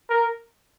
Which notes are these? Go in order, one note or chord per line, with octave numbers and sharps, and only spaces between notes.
A#4